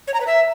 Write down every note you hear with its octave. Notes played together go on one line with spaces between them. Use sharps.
C#5
A#5
B4
E5